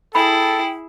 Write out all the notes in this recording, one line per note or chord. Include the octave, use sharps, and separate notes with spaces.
E4 G#4 A4 G5 B5